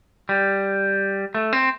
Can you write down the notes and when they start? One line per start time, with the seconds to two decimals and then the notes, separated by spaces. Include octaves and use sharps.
0.29 G3
1.35 A3
1.53 C4